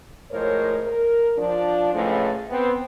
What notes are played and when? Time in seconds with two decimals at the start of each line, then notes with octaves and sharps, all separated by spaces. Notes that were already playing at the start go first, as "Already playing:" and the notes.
0.32 A2 F3 G#3 A#4 C5 C#5
0.86 A#4
1.38 F3 D4
1.92 A2 C#3 E3 F3 G#3 A3
2.50 B3 C4